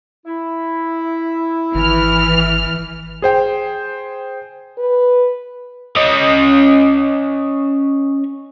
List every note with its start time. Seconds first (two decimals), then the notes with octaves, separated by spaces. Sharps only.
0.25 E4
1.75 G#1 E3 F6
3.22 G#4 C5 G5
4.78 B4
5.97 C#4 D#5